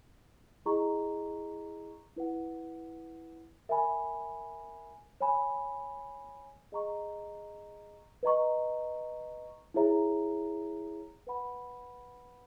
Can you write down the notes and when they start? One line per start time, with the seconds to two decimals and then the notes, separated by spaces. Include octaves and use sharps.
0.66 E4 G#4 D#5 A#5 C#6
2.17 E4 B4 F#5
3.69 A#4 E5 G#5 B5
5.21 C#5 G#5 B5
6.72 G#4 D#5 A#5 C#6
8.23 B4 D#5 A#5 C#6
9.74 E4 G#4 C#5 E5 A#5
11.27 B4 F#5 B5